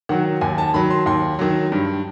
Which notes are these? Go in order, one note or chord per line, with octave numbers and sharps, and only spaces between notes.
D#3 F#3 F#5
D#2 G#5
A5
D#3 F#3 B5
C6
D#2 C6
D#3 F#3
G2